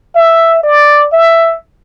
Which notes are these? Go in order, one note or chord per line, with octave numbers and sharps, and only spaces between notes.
E5
D5
E5